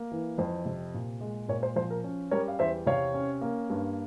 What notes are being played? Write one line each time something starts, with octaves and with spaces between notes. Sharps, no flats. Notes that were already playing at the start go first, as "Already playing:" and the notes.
Already playing: A#3
E3
F2 C5
C3
A#2
G#3
A#2 A#4 C#5
C5
F3 C5
A#4
C#4
G3 A#4 C#5
F5
E2 C5 E5
C3 C#5 F5
C#4
A#3
G2